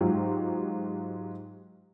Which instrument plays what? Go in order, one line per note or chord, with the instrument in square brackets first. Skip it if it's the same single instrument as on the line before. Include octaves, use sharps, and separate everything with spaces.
[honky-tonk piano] G#2 F#3 F4 G4